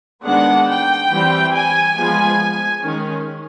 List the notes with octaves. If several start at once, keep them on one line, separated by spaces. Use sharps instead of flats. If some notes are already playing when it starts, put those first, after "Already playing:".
D#3 G#3 B3 D4 F#5
G5
E3 G3 C4
G#5
F3 G#3 B3
D#3 G#3 C#4